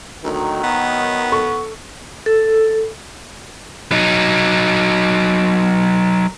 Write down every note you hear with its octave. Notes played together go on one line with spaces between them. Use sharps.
D2 D#3 F#3
B3
A4 C#6
A4
F#3 D#4